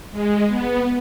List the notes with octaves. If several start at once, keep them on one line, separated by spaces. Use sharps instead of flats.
G#3
B3